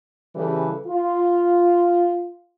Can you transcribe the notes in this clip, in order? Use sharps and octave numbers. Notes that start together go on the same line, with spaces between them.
C#3 E3 G3 A4 B4
F4